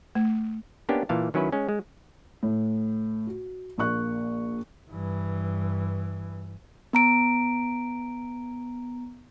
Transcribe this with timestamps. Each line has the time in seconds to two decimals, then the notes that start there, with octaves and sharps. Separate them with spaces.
0.15 A3
0.89 A#3 B3 C#4 D4 G4
1.09 A#2 E3 F5 A5
1.34 D#3 F#3 C#4 E4 B4
1.52 G#3 C#4
1.69 G#3
2.43 A2
3.27 F#4
3.78 A#1 A#3 C#6 F#6
4.89 G2 E3
6.93 B3 A#5 D7